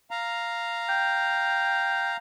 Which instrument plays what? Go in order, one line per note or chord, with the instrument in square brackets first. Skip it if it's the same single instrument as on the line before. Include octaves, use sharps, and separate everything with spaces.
[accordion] F5 A#5
[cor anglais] G5